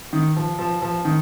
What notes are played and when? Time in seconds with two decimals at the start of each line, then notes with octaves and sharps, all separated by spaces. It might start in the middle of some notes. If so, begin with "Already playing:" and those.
0.13 D#3
0.36 F3
0.59 F3
0.82 F3
1.05 D#3